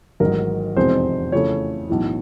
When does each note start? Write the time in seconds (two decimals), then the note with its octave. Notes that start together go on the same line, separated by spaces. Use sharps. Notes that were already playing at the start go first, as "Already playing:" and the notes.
0.20 A1 G#2 D#3 F#3 A#4
0.76 F1 E2 B2 G#3 C4 C5
1.32 F2 C#3 E3 A3 C#5
1.89 B1 A2 E3